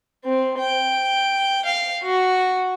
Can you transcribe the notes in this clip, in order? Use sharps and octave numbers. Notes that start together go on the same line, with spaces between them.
C4
G5
F5
F#4